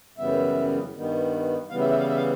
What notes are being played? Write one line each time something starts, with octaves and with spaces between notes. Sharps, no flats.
F#2 C#3 E3 G3 B3 E5
G2 D#3 G3 B3
C#3 E3 G3 B3 F5
E5
E5
F5
E5
F5